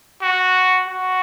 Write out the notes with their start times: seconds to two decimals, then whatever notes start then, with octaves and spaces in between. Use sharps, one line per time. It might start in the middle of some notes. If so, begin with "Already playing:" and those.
0.22 F#4
0.88 F#4